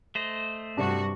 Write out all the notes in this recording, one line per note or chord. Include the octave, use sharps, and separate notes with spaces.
A3 C5 D#5
G2 C3 D4 F#4